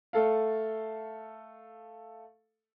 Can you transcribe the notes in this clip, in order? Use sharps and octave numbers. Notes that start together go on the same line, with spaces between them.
A3 A4 F5